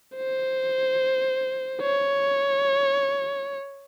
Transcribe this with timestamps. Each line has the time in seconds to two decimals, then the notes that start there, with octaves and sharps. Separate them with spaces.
0.16 C5
1.81 C#5